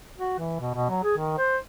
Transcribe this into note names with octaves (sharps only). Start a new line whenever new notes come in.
F#4
E3
B2
B2
F#3
G#4
D#3
C5